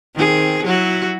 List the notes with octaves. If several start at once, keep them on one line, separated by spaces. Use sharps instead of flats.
D#3 C4 G#4
F#3 E4 F#4